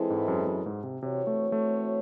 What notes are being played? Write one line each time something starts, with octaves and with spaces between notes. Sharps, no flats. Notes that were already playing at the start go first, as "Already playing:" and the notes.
Already playing: E3 G#3 C4 E4 A4
G#2
F#2
F#2
G#2
C3
C3 E3 C4 F#4 C#5
A3
A3